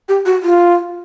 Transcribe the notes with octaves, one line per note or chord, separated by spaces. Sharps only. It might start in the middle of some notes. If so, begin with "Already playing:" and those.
G4
F#4
F4